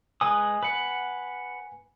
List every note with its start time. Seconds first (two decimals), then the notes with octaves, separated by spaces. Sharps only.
0.21 G#3 B4 G#5 D#6
0.63 B4 F#5